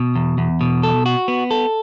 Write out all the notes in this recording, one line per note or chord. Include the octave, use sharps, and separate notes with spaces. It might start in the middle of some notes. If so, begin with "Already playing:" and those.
Already playing: B2
E2
E2
B2
A4
F#4
B3
A4